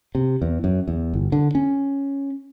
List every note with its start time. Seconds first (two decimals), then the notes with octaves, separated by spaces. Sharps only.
0.15 C3
0.42 E2
0.64 F#2
0.88 E2
1.14 G1
1.32 D3
1.55 C#4